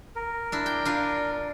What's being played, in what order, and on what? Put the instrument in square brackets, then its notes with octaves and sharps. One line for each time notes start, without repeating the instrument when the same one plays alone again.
[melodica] A#4
[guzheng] D4 E4
G5
D4 F4